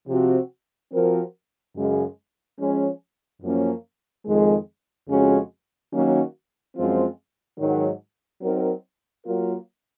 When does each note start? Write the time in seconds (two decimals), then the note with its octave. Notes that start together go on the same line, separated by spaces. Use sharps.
0.08 C3 F3 C4 F#4
0.92 F3 C4 F#4 A#4
1.75 F#2 C#3 G#3
2.59 F3 G#3 C#4
3.42 F#2 F3 A#3 C#4
4.25 F2 D#3 G#3
5.09 F2 C#3 G#3 C#4 F#4
5.92 D#3 F#3 A#3 C#4 F#4
6.76 F#2 F3 G#3 C4 F4
7.59 G#2 D#3 F#3
8.42 F#3 C4 D#4 A#4
9.26 F#3 A#3 F4 A#4